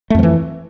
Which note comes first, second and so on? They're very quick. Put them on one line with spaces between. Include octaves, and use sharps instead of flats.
A3 F2 F3 E3